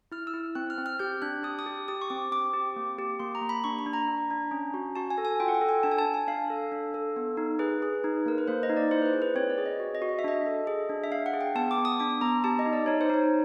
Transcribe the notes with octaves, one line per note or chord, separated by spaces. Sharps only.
E4 F6
E6
E4
C4 F#6
F6
C4
F6
G4 G6
D4 F#6
G4 D#6
D#6
G4
G4 D#6
C#6
C4 D6
C4 D6
G4
A#3
G4
A#3 C6
A#5
A#3
B5
D4 C#6
B5
D4
A#5
D4
D4
C#4
F#4
F#4 A5
G#5
A4
G#5
F4 G5
F#5
G5
A4
G#5
D4 A5
G#5
A5
D4
G#5
D4 F5
A4
D4
A4
B3
D#4
G#4 B4
G#4
D#4
A#3 A#4
B4
A#3 C5
D#5
D#4
D5
E4 C5
B4
C5
G#4
B4
C4 C#5
D5
G#4
D#5
F#4
D#5
F#4
D#5
E5
D4 D#5
A4
G#4
D4
E5
D4 F5
F#5
G#4
G5
B3 A5
D6
B3
D#6
D4 D6
B3 A#5
G4 A5
D#5
D#4
D5
D#4 C#5
C5
D#4 C#5